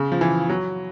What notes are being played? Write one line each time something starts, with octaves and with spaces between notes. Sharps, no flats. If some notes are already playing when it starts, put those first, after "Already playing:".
Already playing: C#3
F3
E3
F#3